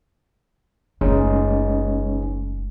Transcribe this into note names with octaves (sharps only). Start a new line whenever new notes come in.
F#1 G#3 A3 C#4 D#4